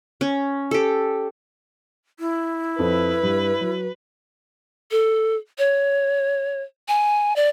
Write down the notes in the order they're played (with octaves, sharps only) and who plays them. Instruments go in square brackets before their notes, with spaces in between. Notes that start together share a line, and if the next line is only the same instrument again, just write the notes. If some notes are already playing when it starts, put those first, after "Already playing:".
[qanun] C#4
G4 A4
[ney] E4
[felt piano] F2 A4 [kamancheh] B4
[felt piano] G2
F#3
[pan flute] A4
C#5
G#5
D5